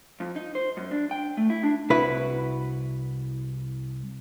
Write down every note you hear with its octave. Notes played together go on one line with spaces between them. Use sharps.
F2
D#4
C5
F#2
D4
G5
A3
E4
D4
C2 E4 F#4 B4